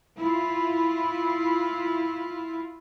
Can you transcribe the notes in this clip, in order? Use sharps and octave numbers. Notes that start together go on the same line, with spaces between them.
E4 F4